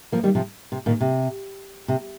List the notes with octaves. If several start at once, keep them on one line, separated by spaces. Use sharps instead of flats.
F3 A#3
D#3 G3
C3 F3
C3
A#2 D#3
C3
C3